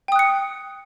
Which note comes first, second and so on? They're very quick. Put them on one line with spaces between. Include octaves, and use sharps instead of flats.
G5 D#6 F#6 C#7